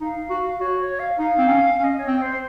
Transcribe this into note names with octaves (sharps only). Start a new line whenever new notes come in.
D#4 F5
F#4
F#4 C#5
C#5
F5
D#4 F5
C4
C#4
C#4 F5
D#5
C#5
C4
D#5
C5